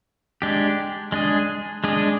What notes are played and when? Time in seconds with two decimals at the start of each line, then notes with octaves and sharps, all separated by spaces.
0.42 G#3 D4 G4
1.12 G#3 D4 G#4
1.84 G#3 D4 G#4